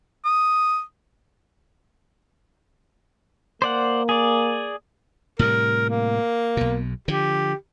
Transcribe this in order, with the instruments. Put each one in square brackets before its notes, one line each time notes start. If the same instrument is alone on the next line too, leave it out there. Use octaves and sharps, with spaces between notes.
[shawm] D#6
[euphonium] A#3 [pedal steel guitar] C5 D5 F#5
[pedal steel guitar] G#4 D5
[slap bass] A2 C3 G3 [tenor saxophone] A#4
[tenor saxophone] A#3
[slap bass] B1 B2
[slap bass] D3 F3 [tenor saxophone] G4